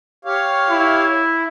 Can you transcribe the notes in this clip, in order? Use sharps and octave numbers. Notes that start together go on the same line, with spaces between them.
G4 C#5 F5
E4